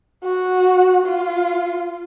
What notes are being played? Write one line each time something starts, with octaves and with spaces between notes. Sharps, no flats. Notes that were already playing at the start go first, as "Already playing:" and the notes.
F#4
F4